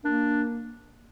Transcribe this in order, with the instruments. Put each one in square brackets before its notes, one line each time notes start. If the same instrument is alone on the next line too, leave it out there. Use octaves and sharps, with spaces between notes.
[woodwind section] A#3 [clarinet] D4